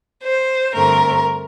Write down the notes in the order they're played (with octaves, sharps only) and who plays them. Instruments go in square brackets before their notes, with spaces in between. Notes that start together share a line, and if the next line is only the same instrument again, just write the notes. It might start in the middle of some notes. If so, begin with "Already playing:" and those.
[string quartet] C5
G2 D3 A3 C4 A#4